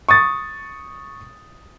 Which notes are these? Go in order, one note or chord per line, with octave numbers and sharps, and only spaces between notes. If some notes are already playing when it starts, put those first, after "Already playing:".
C#6 D#6 A6